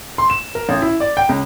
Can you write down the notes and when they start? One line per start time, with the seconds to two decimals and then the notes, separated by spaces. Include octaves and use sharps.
0.18 C6
0.30 E7
0.55 A#4
0.69 A1
0.82 E4
1.00 D5
1.17 G5
1.29 C#2